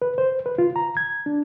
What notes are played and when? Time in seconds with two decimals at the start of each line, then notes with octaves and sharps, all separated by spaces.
0.02 B4
0.18 C5
0.46 B4
0.58 F4
0.76 A#5
0.97 G#6
1.26 D4